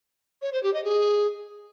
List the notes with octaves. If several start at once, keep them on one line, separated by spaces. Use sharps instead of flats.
C#5
C5
G4
D#5
G#4